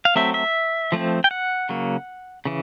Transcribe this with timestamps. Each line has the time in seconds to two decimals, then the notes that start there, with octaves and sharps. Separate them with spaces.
0.05 F5
0.16 F#3 A3 C4 E5
0.34 E5
0.92 F3 A3 C4
1.24 G5
1.31 F#5
1.69 C#3 F#3 A#3
2.45 C#3 E3